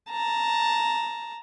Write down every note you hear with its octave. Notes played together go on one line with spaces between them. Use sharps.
A5 A#5